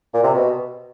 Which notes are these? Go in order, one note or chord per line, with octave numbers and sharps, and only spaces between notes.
A#2
C3
B2